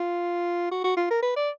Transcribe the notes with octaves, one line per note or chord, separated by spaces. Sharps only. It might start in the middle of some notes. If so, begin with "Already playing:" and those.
Already playing: F4
F#4
F#4
F4
A#4
B4
D5